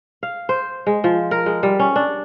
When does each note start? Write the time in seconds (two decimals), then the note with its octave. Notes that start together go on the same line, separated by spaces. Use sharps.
0.23 F5
0.49 C5
0.87 G#3
1.04 F3
1.31 A#4
1.46 G#3
1.63 G3
1.79 C#4
1.96 D4